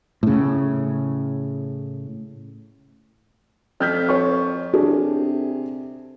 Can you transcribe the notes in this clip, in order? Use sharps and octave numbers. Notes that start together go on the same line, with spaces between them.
A2 C#3
F2 F6 G6 B6
C#5 C#6
C3 D4 G#4 A4